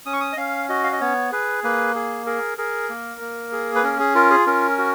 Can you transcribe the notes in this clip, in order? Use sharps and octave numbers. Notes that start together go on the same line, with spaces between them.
C#4 D#6
C#6
D#6
D#5
C#4 F5
F#4 D#5
F5
D#5
B3 C#5
G#4 B4
A#3 B4
G#4
G#4 A#4
G#4 A#4
A#3
A#3
G#4
B4
C#4 A#4
G#4
F4 A#4
G#4
C#4 A#4
F#4